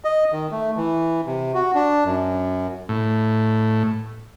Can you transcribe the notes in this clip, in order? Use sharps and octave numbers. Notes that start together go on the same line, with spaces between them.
D#5
D#3
A3
E3
C3
F#4
D4
F#2
A2